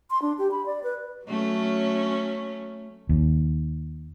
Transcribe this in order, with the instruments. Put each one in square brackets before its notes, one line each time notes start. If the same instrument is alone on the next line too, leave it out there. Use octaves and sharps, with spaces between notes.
[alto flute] C6
D4
G4
B5
D5
B4
[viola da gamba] F#3 A3 C#4
[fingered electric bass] D#2